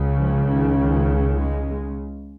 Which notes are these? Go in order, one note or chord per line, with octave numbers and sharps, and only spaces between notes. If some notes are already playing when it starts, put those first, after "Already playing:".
Already playing: C#2 C#3
F3
D#3
D#3
G#3